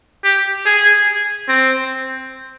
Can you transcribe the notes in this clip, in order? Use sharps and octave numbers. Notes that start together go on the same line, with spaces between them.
G4
G#4
C4